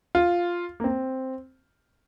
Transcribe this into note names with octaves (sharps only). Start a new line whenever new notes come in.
F4
A#3
C4